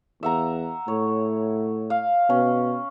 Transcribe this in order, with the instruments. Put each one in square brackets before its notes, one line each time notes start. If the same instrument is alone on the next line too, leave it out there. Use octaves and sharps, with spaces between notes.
[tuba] E2 [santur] E5 F#5 A#5
[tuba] A2 [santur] C#5
[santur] F5
[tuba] B2 [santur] C#4